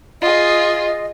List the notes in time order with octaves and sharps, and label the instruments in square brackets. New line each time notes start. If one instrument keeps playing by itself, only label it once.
[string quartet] F4 G#4 [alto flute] D#5